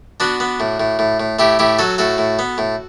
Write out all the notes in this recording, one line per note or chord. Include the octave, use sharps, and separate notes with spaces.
B3 D4 F#4
B3
A2
A2
A2
A2
A2 E4 G4
A2 E4 G4
F#3 F#4 A4
A2 F#4 A4
A2
B3
A2